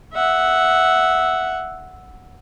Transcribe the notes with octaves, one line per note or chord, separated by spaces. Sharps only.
E5 F#5